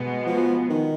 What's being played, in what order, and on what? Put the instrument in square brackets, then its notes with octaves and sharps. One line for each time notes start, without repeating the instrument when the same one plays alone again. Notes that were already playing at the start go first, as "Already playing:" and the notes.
Already playing: [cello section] B2 G#3 B3
[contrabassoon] F3
D#3